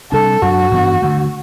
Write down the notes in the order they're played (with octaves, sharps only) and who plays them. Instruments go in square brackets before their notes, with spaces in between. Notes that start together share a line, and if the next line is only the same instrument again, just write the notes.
[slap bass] C3 G3 D4 [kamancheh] A4
[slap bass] F#2 F#3 B3 D4 [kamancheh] F#4
[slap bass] G2 E3 B3 D4
G2 D3 A3